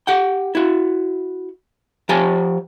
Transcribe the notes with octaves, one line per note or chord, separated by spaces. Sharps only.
G4 F#5 G5
E4 F#4
F3 G4 G#5 A5